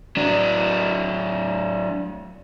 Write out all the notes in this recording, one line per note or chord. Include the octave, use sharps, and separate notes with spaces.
F#3 D4